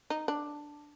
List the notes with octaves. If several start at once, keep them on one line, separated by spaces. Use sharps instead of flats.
D#4
D4